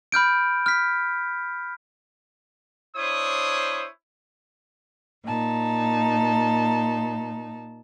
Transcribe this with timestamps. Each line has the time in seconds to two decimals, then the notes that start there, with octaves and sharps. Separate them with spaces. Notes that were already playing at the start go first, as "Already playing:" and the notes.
0.12 B5 F6 G6 D7
0.66 F6 B6
2.96 D4 E4 C5 C#5 D#6
5.25 A#2 D#4 A5